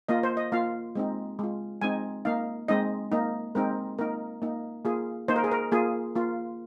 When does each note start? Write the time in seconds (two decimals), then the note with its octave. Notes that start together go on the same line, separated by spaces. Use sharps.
0.09 A#3 F4 D#5
0.23 C5
0.37 D#5
0.52 A#3 F4 F5
0.95 G#3 C4 D#4
1.39 G#3 F4
1.82 G#3 C4 D#4 G#5
2.25 A#3 D#4 F5
2.68 G#3 C4 D#4 D#5
3.12 A#3 D#4
3.55 G#3 C4 D#4 A#4
3.99 A#3 D#4 A#4
4.42 A#3 D#4
4.85 A#3 F4 G#4
5.28 A#3 D#4 C5
5.36 A#4
5.44 G#4
5.51 A#4
5.72 A#3 F4 G#4
6.15 A#3 F4